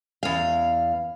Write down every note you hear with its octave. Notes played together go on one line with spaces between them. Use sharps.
E2 F5